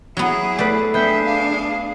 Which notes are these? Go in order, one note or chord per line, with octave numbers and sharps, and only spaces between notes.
F#3 B3 E4 G#4
A3 B4 D5
B3 D4 G#4 E5 G5
F5